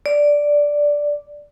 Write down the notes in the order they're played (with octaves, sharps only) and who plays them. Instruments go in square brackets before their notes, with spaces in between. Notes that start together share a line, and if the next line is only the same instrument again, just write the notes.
[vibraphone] D5